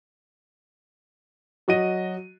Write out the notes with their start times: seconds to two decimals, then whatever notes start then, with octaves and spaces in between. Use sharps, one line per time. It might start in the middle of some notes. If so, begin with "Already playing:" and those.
1.68 F#3 F#4 D#5 D#7